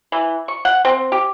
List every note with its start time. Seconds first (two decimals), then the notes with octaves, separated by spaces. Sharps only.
0.12 E3
0.48 C#6
0.65 F#5
0.85 C4
1.12 G4